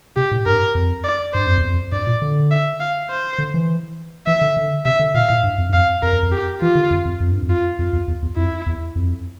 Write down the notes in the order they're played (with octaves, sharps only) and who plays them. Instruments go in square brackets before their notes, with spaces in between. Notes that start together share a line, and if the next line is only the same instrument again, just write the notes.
[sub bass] C3 [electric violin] G4
[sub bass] A2
[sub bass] G2 [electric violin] A#4
[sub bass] F2
[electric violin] D5
[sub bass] G2 [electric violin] C5
[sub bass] F2
E2
F2
[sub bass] G2 [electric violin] D5
[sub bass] A#2
D3
[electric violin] E5
F5
C5
[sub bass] D3
E3
[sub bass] E3 [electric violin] E5
[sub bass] D3
D3
[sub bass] C3 [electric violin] E5
[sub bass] D3
[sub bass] A#2 [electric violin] F5
[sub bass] A2
G2
F2
G2
[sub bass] F2 [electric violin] F5
[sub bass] F2 [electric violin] A#4
[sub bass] F2
F2
[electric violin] G4
[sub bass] E3 [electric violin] F4
[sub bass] D3
F2
F2
F2
G2
F2
[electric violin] F4
[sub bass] F2 [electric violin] F4
[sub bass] E2
E2
E2
[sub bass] F2 [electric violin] E4
[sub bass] E2
F2